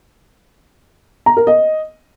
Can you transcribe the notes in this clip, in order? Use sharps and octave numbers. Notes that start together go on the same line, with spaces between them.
A#5
A#4
D#5